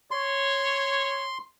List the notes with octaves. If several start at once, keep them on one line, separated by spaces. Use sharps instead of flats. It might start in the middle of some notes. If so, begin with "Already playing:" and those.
C#5 C6